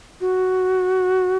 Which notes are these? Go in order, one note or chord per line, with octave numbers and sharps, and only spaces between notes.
F#4